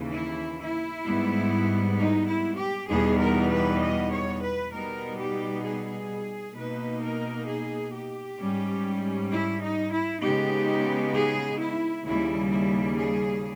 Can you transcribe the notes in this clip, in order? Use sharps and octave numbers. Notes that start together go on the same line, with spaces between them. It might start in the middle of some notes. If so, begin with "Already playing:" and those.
Already playing: D#2 C#3 E3
E4
E4
G#2 G3 B3
D#4
E4
G4
E2 B2 G3 B3 D#4 G#4
A#4
B4
D#5
C#5
B4
B2 G3 B3 D#4 A#4
G4
G#4
B2 A#3 D#4 B4
A#4
G#4
G4
G#2 G3 C#4
E4
D#4
E4
C#3 G#3 B3 D#4 G4
G#4
E4
D#2 C#3 G3 E4
E4
G#4